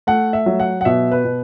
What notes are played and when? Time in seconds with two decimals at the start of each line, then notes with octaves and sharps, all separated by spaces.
0.07 A3 F#5
0.33 E5
0.46 F#3
0.60 F#5
0.81 F#5
0.85 B2 E5
1.11 B4
1.25 B2